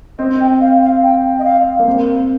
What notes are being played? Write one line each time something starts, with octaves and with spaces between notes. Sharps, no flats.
C4 D#5
G5
F5
F5
G5
D#5
F5
A#3
C4